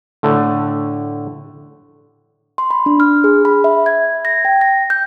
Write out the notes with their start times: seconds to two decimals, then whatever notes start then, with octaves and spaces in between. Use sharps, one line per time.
0.23 A2 D3 A3
2.58 C6
2.71 B5
2.86 D4
3.00 F6
3.24 G#4
3.45 B5
3.64 E5
3.86 G#6
4.25 A#6
4.45 G5
4.61 A#6
4.90 G6